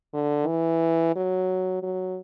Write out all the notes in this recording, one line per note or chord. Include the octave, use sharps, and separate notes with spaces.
D3
E3
F#3
F#3